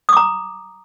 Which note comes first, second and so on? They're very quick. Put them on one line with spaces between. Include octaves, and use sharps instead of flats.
D#6 D6 A#5